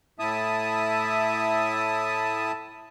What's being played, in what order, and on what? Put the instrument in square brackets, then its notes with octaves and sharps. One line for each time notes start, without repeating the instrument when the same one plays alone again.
[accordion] A2 E4 E5 A5 D#6